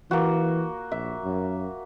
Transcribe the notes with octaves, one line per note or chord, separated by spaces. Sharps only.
E3 A#3 F#4
A#1 E5
F#2